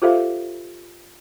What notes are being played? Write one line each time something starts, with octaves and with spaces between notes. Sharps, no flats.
F4 G4 A4 C5 E5 F5